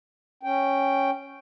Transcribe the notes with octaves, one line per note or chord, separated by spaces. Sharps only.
C#4 G5